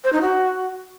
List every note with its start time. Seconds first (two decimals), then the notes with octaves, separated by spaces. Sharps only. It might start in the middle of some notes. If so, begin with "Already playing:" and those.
0.04 C5
0.13 D#4
0.22 F#4